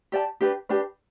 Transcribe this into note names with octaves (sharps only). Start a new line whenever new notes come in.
G4 D5 A5
D4 G4 B4
D4 G4 B4